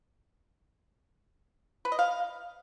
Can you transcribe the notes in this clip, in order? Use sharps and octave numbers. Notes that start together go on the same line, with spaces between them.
B4
D#5
F5